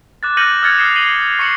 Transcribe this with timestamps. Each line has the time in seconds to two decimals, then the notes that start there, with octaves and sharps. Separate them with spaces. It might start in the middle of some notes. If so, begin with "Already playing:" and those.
0.23 D6 F#6 A6
0.37 F6 G6 A#6 C#7 D#7 F#7
0.62 D#6 F6 F#6 G#6 A6 C#7
0.78 D#6 F6 C7 C#7 E7
0.96 C7 D#7 F#7 G7
1.39 C#6 C7 C#7 E7 F#7